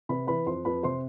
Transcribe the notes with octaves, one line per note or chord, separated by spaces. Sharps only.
C3 B4 B5
E3 B4 B5
F2 C5 C6
F2 B4 B5
C3 C5 C6